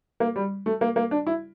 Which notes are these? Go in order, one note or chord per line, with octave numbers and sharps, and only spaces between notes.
A#3
G3
A3
A#3
A#3
D4
E4